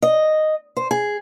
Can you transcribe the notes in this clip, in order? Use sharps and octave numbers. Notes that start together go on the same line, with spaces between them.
D#5
C5
G#4